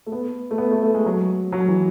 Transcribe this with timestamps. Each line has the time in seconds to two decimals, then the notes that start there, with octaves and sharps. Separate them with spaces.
0.06 A3
0.12 B3
0.51 A3
0.58 B3
0.71 A3
0.83 A3
0.94 G#3
1.06 F#3
1.52 F#3
1.68 E3